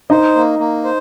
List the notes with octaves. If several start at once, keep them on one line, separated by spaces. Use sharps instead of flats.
D#4 C5 D#5
A#3
A#3
C5